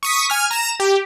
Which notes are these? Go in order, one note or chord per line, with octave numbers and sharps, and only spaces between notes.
C#6 D#6 B6
G#5 F6
A#5 E7
G4